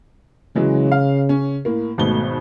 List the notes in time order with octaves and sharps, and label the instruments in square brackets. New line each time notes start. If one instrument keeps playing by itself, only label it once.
[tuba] C#3 [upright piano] E3 F#3 G#3
[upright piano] F5
C#4
A2 A#3
[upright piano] G#1 B2 G7 [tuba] A3